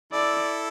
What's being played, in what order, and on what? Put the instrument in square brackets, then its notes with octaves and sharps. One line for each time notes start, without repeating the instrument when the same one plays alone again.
[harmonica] E4 A4 [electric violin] D5